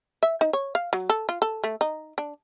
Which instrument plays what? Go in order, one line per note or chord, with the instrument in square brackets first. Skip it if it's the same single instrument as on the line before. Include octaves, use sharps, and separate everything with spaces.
[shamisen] E5
D#4
C#5
F5
F#3
A4
F4
A4
A3
D#4
D4